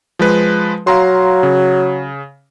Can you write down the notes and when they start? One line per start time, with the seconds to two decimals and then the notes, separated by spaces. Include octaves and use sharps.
0.19 F3 G#3 B4
0.87 F#3 F5 A#5 C6
1.43 C#3